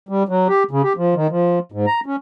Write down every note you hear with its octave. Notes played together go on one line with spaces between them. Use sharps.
G3
F#3
G4
C#3
G4
F3
D#3
F3
G#2
A#5
C#4